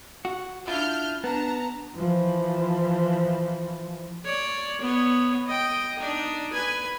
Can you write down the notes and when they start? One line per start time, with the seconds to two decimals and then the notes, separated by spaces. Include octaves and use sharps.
0.25 F#4
0.68 D4 E4 F4 F6 G6
1.24 B3 D4 A5 A#5
1.95 E3 F3
4.24 C#5 D5
4.81 B3 C#5
5.46 D#5 G5
5.99 D4 D#4
6.52 B4 G#5